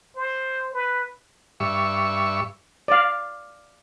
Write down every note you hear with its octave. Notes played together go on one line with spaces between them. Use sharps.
C5
B4
G2 E5 C#6
D5 F5